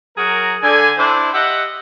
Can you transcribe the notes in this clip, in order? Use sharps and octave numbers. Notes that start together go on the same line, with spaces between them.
F#3 F#4 G#4 A#4
D3 G#5
D4 E4 C5
G4 D#5 E5 F#5